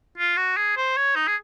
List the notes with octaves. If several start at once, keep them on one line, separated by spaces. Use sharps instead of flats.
F4
F#4
G#4
C5
C#5
D#4
G#4